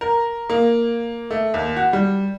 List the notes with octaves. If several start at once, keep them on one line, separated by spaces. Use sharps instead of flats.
A#4
A#3
A3
D#2
F#4
G3